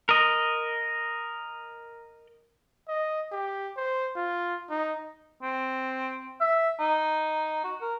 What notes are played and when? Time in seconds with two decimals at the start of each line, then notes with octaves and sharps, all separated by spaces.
0.09 A#4 D#5
2.88 D#5
3.32 G4
3.77 C5
4.16 F4
4.70 D#4
5.43 C4
6.41 E5
6.80 D#4
7.64 F#4
7.81 A#4